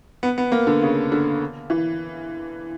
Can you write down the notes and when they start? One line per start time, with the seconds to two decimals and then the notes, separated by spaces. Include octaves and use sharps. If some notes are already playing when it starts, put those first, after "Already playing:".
0.23 B3
0.38 B3
0.52 A#3
0.67 D3
0.82 C#3
1.12 D3
1.70 E3